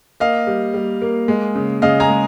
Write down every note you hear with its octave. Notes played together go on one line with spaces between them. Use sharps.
A#3 D#5 F5
G3
G3
A#3
G#3
C#3
C#3 D#5 F5
G#5 A#5
G#3